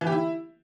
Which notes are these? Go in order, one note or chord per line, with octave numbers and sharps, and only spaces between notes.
E3
G4
E4